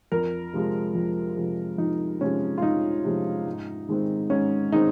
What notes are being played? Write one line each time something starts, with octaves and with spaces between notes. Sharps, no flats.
F2 A#4
C3 F3 G#3
F2
C3 F3 G#3
F2 D#4
C3 F3 G#3 C#4
F4
F2 D#4
C3 F3 G#3
G#2
D#3 G#3 C4
G#2 C#4
D#3 G#3 C4 D#4